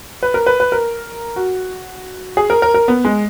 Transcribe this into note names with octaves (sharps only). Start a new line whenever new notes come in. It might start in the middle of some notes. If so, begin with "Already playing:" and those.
B4
A#4
B4
B4
A#4
F#4
G#4
A#4
A#4
A#4
B3
G#3